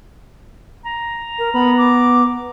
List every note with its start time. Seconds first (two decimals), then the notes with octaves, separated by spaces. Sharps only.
0.85 A#5
1.39 A#4
1.54 B3 B5
1.78 D6